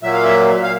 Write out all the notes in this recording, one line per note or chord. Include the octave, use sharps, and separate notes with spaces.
A#2 F#3 A#3 E5
F5
E5
F5